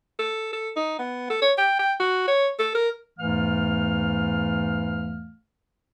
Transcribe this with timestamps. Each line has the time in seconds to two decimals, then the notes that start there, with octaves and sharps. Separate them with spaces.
0.19 A4
0.53 A4
0.77 D#4
0.99 B3
1.30 A4
1.42 C#5
1.58 G5
1.79 G5
2.00 F#4
2.28 C#5
2.59 A4
2.75 A#4
3.19 E2 G#2 E3 A3 F5 F6